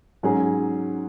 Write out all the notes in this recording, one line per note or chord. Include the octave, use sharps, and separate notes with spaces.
G#2 F#3 C#4 G#4